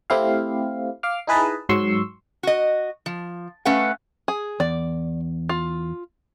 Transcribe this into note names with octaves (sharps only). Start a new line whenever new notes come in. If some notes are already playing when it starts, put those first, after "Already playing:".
A3 C4 E4 G4 F5
F5 D6 F6
D#4 E4 G#4 B4 D#5 A5
G#2 F#3 C6 C#6 E6
F#4 D#5
F3
A3 C#4 B4 F5 F#5
G#4
E2 D5
F4